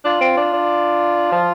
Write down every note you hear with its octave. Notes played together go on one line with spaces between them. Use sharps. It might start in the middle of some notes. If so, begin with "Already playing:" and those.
D4 F4
C4
D4
D4
F3